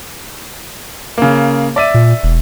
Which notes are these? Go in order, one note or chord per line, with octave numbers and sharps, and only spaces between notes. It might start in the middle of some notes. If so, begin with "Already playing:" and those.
C#3 A#3
D5 E5 D#7
A#2
E1